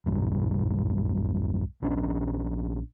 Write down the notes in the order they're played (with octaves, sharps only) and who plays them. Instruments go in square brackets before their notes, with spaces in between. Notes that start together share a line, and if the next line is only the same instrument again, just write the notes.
[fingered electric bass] E1 B1 G2
A#1 B3 C#4 D4